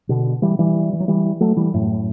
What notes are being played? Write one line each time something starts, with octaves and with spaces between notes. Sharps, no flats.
B2 D3
E3 G3
E3 G3
E3
F#3
E3 G3
F#3 A3
E3 G3
F#2 A2